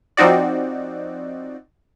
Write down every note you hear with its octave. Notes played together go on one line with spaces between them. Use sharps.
F3 C4 D#4 F#4 D5